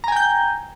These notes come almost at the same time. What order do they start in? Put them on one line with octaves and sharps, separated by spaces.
A#5 G#5 G5 G6